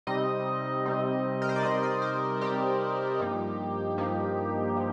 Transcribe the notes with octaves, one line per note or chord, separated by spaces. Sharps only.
C3 G3 C4 D#4 D#5
C3 G3 C4 D#4
A#4
C5
D5
C3 G3 C4 D#4 D#5
D5
C5
C3 G3 C4 D#4 G4
G2 F3 A#3 D#4
G2 F3 A#3 D#4
F3